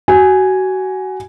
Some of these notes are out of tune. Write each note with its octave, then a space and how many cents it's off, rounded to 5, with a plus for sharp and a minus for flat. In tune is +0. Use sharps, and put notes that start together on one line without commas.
F#4 +25 G#5 +0